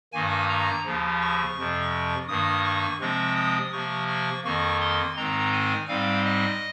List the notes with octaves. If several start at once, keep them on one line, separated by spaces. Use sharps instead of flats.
G2 D#3 A#3 G#5
A#5
D#2 C#3 F3
C#6
F2 C3 F3
G2 D#3 A#3 D#6
C#6
C3 F3 G#3 C4 C#6
D#6
C3 F3 A#3 C#6
C#6
F2 D#3 A#3 C#6
C6
G#2 D#3 G#3 C4 A#5
G#5
G#2 G3 C4 F5
D#5